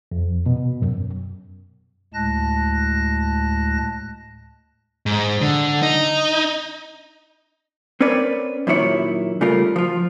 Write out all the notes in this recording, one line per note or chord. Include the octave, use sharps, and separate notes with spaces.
F2
B2
F#2
D2 A2 G#3 A5 F#6 A#6
G#2
D3
D#4
C4 C#4 A#4 B4 D5
F#2 A#2 D#3 E4 C#5
C#3 G3 A3 F4 A#4
F3 F4